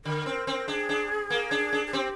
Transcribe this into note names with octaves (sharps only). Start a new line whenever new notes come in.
D3 A#4
C4
C4
D4 G#4
D4
A#3
D4
D4
G#4
C4 G4